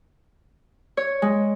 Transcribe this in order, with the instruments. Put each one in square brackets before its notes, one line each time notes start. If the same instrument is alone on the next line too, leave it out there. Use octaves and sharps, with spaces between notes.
[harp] C#5
G#3